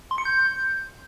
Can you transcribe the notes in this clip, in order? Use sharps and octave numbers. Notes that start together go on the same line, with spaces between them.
C6
C#7
G6